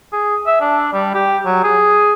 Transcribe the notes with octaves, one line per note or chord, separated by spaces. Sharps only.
G#4
E5
D4
G3
G4
F#3
G#4